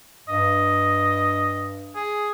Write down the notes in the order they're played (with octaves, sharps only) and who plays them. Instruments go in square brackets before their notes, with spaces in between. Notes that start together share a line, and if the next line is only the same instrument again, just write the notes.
[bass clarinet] G2 [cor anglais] D#5
[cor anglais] G#4